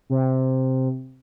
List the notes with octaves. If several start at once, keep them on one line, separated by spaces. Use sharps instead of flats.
C3